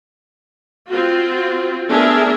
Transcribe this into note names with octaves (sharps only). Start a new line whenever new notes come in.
C4 F4 F#4
A3 B3 D4 G#4 A#4 E5